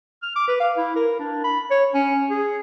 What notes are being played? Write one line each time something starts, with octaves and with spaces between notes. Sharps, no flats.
F6
D6
B4
F5
E4
A#4
D4
B5
C#5
C#4
G#4